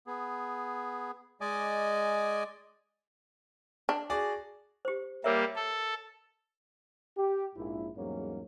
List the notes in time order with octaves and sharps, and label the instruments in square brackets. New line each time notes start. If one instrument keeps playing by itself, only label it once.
[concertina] B3 G#4
G#3 D5 D#5 G#5 D6
[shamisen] D4
[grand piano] F#4 G#4 D5
[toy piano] G4 C5
[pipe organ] G3 A#3 [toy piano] A#4 C#5 E5
[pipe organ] A4
[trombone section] G4
A#1 G#2 E4
E2 G#2 F#3 G3 A#3 C#4